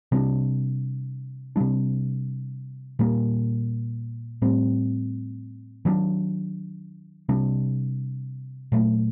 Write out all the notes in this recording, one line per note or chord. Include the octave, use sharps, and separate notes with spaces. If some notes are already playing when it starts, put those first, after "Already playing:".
C3 G3 A#3 D4
C3 G3 D4
A#2 G3 A#3
A2 G3 C4
D#3 F#3 A#3 D4
C3 G3 D4
A#2 F#3 A3